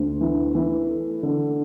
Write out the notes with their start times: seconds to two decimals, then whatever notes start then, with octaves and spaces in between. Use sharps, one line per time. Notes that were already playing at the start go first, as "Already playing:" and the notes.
Already playing: D2
0.21 E3
0.55 E3
0.89 A3
1.23 D3